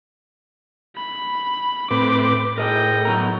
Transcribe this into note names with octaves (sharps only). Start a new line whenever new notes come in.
B5
A2 C4 B4 D6
A2 G#4 A#4 D#5 G5
F#3 B3 A#5